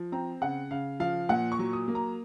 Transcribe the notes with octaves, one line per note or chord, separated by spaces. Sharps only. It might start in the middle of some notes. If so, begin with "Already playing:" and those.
Already playing: F3
C4 A#5
C#3 F#5
C#3 F5
F3 F5
A#2 F#5
C#6
F#3
D#6
A#3
A#5